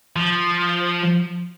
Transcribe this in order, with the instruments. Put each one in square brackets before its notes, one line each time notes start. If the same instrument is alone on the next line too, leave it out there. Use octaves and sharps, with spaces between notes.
[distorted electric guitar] F3